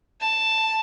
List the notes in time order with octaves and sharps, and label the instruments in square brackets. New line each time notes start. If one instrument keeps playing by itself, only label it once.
[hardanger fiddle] A5